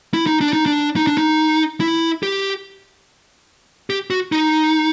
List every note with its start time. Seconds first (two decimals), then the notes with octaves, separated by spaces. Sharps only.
0.14 E4
0.27 D#4
0.41 D4
0.53 D#4
0.66 D4
0.96 D#4
1.07 D4
1.18 D#4
1.80 E4
2.23 G4
3.90 G4
4.10 F#4
4.32 D#4